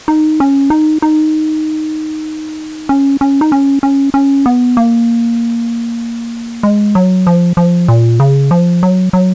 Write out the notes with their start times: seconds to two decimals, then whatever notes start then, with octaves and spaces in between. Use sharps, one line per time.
0.08 D#4
0.40 C#4
0.70 D#4
1.02 D#4
2.89 C#4
3.21 C#4
3.41 D#4
3.52 C#4
3.83 C#4
4.14 C#4
4.46 B3
4.77 A#3
6.63 G#3
6.95 F#3
7.27 F3
7.57 F3
7.88 A#2
8.20 C#3
8.51 F3
8.83 F#3
9.13 F#3